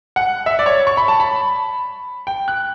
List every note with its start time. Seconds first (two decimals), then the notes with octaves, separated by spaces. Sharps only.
0.16 F#5
0.46 E5
0.59 D5
0.66 C#5
0.87 C#6
0.97 B5
1.08 A5
1.20 B5
2.27 G5
2.48 F#6